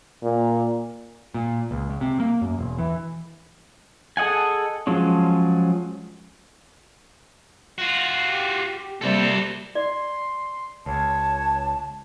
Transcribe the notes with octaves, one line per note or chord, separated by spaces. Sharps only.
A#2
A#2
C#2
C#2
C3
A#3
F#2
E1
E3
G#4 A4 D#5 F#5 G#5
F3 F#3 G#3 C#4
F4 F#4
G4
C3 G3 A#3 A4 C5
D5 C6
C#2 C#5 A5